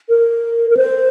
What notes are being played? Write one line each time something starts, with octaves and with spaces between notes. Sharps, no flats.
A#4
A#4
C5